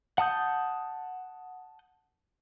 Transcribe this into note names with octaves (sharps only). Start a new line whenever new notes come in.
F#5 A5 D#6 G6